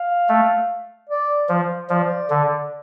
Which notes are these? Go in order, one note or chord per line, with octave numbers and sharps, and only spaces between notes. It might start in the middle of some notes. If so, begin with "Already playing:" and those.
Already playing: F5
A3
D5
F3
F3 D5
D3